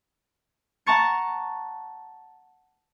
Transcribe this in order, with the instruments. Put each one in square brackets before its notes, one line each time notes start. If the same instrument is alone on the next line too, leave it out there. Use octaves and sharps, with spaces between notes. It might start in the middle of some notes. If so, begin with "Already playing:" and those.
[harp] F#5 A5 A#5 C#6 A6 C#7